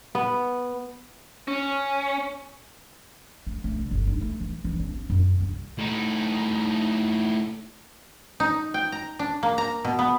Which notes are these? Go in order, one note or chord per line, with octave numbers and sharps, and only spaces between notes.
B3
C#4
A3
A3
C2
G1
D#4
A3
E3
E3
C4
C4
F#2
C2
A2 D#4
D#4
G5
A#5
D4
A#3
A#5
B2
B3